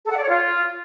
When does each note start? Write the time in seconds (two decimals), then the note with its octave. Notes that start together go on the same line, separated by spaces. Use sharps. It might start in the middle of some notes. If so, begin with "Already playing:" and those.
0.04 A4
0.10 F#5
0.16 D5
0.22 C#5
0.28 F4